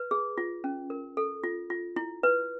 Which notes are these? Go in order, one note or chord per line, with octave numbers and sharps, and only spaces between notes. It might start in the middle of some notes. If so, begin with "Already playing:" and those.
Already playing: B4
G#4
F4
C#4
A#4
A4
F4
F4
E4
B4